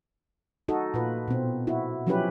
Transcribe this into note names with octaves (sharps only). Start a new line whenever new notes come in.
D#4 F#4 A4 D#5
A#2 F4 B4
B2 C4
E4 F#4
F3 F#3 C#4 E4 G4 B4